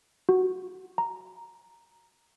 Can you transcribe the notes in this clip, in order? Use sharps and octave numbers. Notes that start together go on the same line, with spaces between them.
F#4
A#5